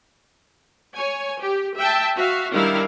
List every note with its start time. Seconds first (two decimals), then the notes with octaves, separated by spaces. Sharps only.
0.95 C#5 G#5
1.41 G4
1.78 E5 G5 A5
2.17 F#4 E5 F5
2.52 D#3 G3 D4 E4 A#4 F5